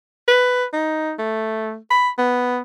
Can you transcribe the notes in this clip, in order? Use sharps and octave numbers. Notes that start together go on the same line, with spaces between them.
B4
D#4
A3
B5
B3